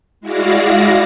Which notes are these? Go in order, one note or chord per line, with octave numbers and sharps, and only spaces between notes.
G#3 E4 F#4 D5 F5 A#6